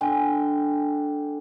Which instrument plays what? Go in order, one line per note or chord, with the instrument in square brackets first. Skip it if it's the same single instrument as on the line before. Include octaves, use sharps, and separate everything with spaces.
[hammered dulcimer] D3 G5 G#5